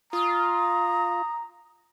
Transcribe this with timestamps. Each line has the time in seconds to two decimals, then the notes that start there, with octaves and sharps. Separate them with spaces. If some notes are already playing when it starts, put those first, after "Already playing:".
0.13 F4 A#5 D#6